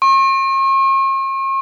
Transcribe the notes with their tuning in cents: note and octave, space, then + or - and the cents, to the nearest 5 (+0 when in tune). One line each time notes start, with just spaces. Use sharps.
C#6 -45